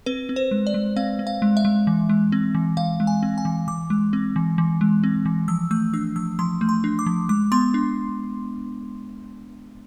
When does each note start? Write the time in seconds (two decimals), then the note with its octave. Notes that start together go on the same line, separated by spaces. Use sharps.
0.06 C4 B4
0.29 C4
0.36 C5
0.51 G#3
0.67 D5
0.74 G#3
0.96 C4 F5
1.19 C4
1.27 F5
1.42 G#3
1.57 E5
1.65 G#3
1.87 E3
2.09 G#3
2.32 C4
2.55 E3
2.77 E3 F5
3.00 G#3
3.07 G#5
3.23 C4
3.38 G#5
3.45 E3
3.68 E3 D6
3.90 G#3
4.13 C4
4.36 E3
4.58 E3
4.81 G#3
5.04 C4
5.26 E3
5.48 F3 E6
5.71 A3 E6
5.93 D4 E6
6.16 F3 E6
6.39 F3 C6
6.61 A3
6.69 C6
6.84 D4
6.99 D6
7.06 F3
7.29 G#3 D6
7.52 B3 C6
7.74 D4